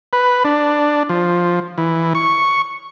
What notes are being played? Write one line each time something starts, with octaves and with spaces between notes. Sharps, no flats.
B4
D4
F3
E3
C#6